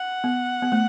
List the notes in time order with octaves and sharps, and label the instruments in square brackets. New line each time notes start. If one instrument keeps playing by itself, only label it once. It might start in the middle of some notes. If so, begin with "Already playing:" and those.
Already playing: [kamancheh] F#5
[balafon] B3
B3
A3